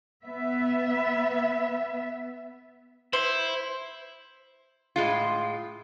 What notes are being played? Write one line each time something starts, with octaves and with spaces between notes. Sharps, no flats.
B3 E5
E4 C5
A2 G#3 F4